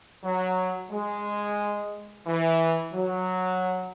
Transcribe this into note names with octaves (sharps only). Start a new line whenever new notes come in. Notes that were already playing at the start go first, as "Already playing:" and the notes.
F#3
G#3
E3
F#3